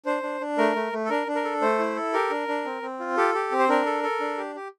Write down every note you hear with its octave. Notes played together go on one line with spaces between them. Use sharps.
D4 C5
D4
D4
A3 A#4
A3
A3
A4
D4 A#4
D4
A#4
A4
A3 C5
E4
A4
G4 A#4
D4
D4
C4
C4
F4
G4 A4
G4
C4
C5
D4 A#4
A4
A4
D4
G4
G4